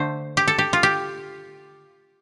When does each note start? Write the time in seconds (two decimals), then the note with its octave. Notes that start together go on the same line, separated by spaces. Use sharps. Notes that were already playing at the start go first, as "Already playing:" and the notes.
Already playing: D3 A3 C5
0.37 G4
0.48 A4
0.59 G4
0.73 F4
0.83 G4